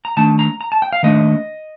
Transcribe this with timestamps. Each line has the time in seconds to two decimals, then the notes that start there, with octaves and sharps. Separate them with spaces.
0.05 A#5
0.17 D#3 A3 D4 A5
0.39 A#5
0.61 A#5
0.72 A5
0.82 G5
0.93 F5
1.03 D#3 A3 D4 D#5